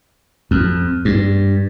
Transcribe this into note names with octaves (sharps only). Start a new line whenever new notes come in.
F2
G2